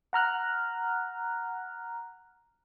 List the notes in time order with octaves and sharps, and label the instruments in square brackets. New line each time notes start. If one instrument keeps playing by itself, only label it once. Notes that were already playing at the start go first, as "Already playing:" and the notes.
[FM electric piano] F#5 A#5 F6 F#6